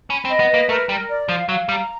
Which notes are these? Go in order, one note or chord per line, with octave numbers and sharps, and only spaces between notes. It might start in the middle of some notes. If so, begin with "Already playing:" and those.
C#4 B5
C4
D#5
B3
A#3 B4
A3 A#4
G3 A#4
D5
F3 F5
F#3 F5
G3 A#5